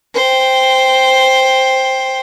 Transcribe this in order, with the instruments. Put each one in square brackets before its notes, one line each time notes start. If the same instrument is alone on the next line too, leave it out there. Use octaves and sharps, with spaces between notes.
[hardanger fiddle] C5 G5